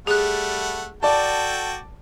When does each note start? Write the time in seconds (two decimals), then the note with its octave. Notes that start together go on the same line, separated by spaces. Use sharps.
0.07 G3 A3 G#4 F#5 F#6
1.03 F#4 A4 D5 G5 A5